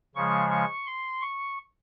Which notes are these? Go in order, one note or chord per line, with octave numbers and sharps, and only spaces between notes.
C#3 F3 G#3 C#6
C#6
C6
C#6